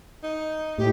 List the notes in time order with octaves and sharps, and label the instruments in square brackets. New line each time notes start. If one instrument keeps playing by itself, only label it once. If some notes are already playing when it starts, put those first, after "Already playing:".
[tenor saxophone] D#4
[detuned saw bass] A2 [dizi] G4